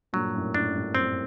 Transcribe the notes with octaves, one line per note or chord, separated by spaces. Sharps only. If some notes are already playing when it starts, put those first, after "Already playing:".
G2 A#2 F#3
F#2 A2
F#2 A2 D4
F#2
G2
F#2 C4